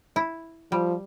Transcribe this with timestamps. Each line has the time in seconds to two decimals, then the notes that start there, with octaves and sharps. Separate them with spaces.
0.16 E4
0.72 F3 G3